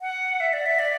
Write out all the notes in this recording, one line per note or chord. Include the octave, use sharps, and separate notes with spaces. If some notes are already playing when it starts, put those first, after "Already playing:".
F#5
E5
D5
E5
D5